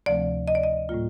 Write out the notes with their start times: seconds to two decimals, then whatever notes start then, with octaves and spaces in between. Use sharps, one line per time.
0.06 D2 C3 F3 A3 C4 D5
0.48 D#5
0.55 D5
0.63 D#5
0.89 A2 G3 A#3 F4